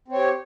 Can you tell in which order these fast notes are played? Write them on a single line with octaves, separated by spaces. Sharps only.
C4 C#5 G4